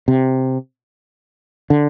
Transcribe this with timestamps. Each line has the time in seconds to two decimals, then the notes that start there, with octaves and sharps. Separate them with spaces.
0.08 C3
1.70 D3